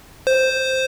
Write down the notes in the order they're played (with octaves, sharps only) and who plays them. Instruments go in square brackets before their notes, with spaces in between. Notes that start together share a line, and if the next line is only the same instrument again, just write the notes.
[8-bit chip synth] C5